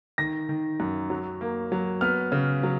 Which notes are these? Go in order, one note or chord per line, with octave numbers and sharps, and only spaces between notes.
D#3 A#6
D#3
F#2
F#3
A#3
F#3
B3 F6
C#3
F#3